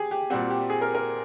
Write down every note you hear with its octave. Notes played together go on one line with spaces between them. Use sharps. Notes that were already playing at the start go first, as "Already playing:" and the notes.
Already playing: G4 G#4
G4
A#2 G3 C4 F#4
G4
G#4
A#4
A#4